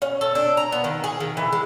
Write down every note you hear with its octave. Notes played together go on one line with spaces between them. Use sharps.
C#4
A4
D4
A#5
B3
D#3
G#4
D#3
E3
G#3